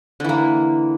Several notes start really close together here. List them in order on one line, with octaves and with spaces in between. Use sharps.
D3 E3 A#3